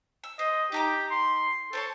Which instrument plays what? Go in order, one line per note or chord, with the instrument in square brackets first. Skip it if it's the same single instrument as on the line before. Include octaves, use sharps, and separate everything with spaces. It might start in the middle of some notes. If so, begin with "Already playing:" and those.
[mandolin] E6
[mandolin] C5 [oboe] D#5
[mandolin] D#4 A#5 D6 [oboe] G4
[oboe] C6
[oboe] A4 [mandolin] C5 C#5 A5